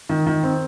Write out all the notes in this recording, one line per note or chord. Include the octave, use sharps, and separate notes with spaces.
D#3
D#3
C4